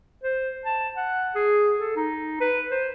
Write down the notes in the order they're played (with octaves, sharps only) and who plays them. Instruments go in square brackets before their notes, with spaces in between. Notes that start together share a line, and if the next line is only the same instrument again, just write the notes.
[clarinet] C5
A5
F#5
G#4
A4
D#4
B4
C5